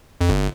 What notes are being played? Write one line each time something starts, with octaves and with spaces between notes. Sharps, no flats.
F2
G1